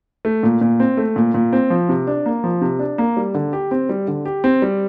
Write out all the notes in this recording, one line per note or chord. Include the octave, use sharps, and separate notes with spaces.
A3
A#2
A#2
C4
A3
A#2
A#2
C4
F3
C3
D4
A#3
F3
C3
D4
A#3
G3
D3
G4
C4
G3
D3
G4
C4
G3